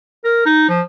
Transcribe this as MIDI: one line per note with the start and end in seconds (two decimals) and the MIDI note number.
0.24 0.41 70
0.46 0.68 63
0.69 0.81 53